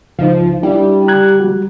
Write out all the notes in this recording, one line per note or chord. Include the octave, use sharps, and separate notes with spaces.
C#2 F3 D#4
G3 D4 E4
A#5 F#6 G#6
G3 F#4